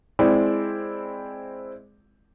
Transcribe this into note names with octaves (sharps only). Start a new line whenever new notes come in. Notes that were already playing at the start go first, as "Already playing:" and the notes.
G#3 C4 E4 D5